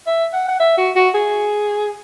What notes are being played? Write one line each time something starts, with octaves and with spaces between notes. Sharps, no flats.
E5
F#5
F#5
E5
F#4
F#4
G#4